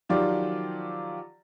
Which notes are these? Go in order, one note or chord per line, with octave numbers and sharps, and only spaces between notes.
D#3 F3 F#3 F4 G4 D5